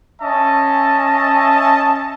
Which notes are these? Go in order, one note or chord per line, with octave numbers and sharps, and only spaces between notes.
C#4 D#5 E5 A5